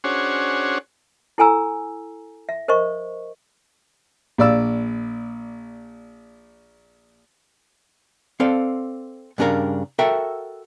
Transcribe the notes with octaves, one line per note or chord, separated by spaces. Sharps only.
C#4 D4 F#4 G#4 C5 C#5
E4 A4 G#5 A#5 E6
E5
A#4 C5 D#5 C#6
A#1 D5 E6
C4 A4 C5 D5 F5
G2 C#3 D4 D#4 A#4 F5
F#4 A4 A#4 E5 F#5 G5